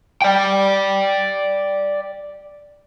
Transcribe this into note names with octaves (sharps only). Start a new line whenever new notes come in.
D5 G5